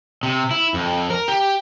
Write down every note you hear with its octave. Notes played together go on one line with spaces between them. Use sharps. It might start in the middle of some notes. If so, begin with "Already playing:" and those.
C3
E4
F2
A#4
G4